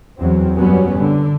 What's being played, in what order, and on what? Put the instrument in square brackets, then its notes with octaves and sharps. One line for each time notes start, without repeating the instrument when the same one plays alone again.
[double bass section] E2 F#3 C4
F#2 F#3 G3 B3 C#4
D3